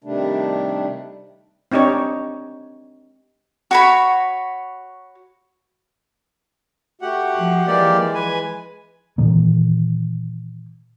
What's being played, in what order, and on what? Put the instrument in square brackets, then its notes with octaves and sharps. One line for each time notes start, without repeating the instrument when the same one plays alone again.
[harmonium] C3 D#3 G3 A3 D4
[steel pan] C4 D4 D#4 G4 C#5
[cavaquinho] F#4 C#5 B5
[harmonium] A3 F#4 [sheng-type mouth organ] G4 F#5
[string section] F3
[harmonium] E3 G#3 [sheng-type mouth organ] A#3 G4 D5
[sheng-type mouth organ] B4 G#5
[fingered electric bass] A#2 D#3 E3 A#3